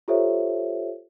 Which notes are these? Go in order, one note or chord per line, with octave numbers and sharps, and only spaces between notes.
F4 G4 A4 C5 C#5 E5